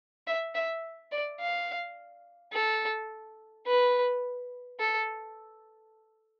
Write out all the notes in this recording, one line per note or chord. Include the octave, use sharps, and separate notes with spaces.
E5
E5
D5
F5
A4
B4
A4